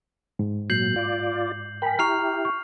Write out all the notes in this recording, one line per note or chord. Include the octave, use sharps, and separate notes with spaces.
G#2
A#2 F#3 G6 C7 F#7
F4 D5
A#4 G5 G#5 B5
E4 G4 A#5 C#6 F6 C7 F7
C#6